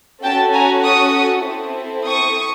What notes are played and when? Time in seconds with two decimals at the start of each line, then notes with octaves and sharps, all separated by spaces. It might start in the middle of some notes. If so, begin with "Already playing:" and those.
0.23 C#4 F#4 A4 G5 A5
0.53 G#5 A#5
0.84 C#6 D#6
1.46 C4 E4 A4
2.07 C#6 D#6